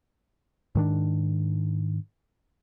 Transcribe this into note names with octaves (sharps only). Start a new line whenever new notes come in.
G#2 D#3 D4